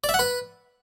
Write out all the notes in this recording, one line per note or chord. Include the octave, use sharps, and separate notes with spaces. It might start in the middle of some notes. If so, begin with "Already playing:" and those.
D5
E5
F#5
B4